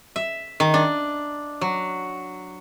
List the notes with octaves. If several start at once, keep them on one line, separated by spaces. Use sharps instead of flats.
E5
D#3
D4
F#3